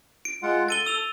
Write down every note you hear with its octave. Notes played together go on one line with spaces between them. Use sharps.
D7
G#3 F4 F#5
A4 A6 D#7 G7
E6 F7 G7